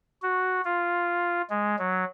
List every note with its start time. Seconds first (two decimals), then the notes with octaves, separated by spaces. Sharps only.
0.22 F#4
0.65 F4
1.50 G#3
1.79 F#3